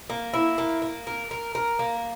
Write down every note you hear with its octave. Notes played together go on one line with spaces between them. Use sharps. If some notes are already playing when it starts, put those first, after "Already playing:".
A#3
E4
A#3
A#3
A#4
A#4
A#4
A#3